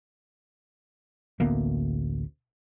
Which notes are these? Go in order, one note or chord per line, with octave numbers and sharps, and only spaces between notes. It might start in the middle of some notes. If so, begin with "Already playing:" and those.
A1 D2 A#3 B3